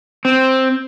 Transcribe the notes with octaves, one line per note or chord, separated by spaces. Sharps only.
C4